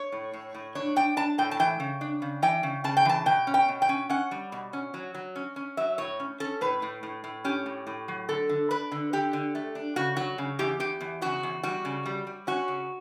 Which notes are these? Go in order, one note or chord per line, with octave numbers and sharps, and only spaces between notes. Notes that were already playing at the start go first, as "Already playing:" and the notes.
Already playing: C#5
A2
A2
A2
D4 C#5
D4 G5
D4 A5
A2 G5
A5
E3 G5
C#3
D4
C#3
E3 G5
C#3
C#3 A5
G5
E3 A5
B2 G5
C#4
G5
B2
G5
C#4
C#4 F#5
G3
B2
C#4
F#3
F#3
C#4
C#4
F#3 E5
A2 C#5
C#4
C#4 A4
A2 B4
A2
A2
A2
C#4 G4
A2
A2
F#3
D3 A4
D3
D4 B4
D3
D3 G4
D3
A3
D4
C#3 F#4
F#3 F#4
C#3
E2 G4
E2 G4
E2
C#3 F#4
E2
G3 F#4
C#3
G3
G3
C#4 F#4
C#3